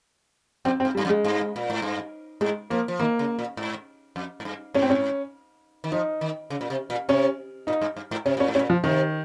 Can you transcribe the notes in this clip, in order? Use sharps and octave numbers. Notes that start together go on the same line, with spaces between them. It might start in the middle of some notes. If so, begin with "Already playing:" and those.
F2 C4
C4
G2
G3
G2
F2
G#3
G2
A#2
G#2
G2
G#2 G#3
F3 A#3
F3
D#3 A#3
C#3
A#2
G#2
F2
G#2
G2
G#2 C#4
C4
C#4
D#3
F3 D#4
D#3
C#3
A#2
C3
A#2
C3 C#4
A#2 D#4
G2
G2
G#2
C3 C#4
A#2 C#4
G#2
C#4
A#2
F3
C3 D#3